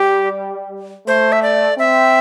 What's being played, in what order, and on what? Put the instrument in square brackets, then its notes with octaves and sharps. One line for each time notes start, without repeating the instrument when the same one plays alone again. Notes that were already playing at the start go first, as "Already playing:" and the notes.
Already playing: [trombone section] G3 [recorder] G4
[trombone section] A3 [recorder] C5
[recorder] E5
D5
[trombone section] C4 [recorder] E5